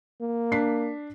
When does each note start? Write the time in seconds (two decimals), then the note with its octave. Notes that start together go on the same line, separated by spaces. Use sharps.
0.21 A#3
0.52 D4 B6 C7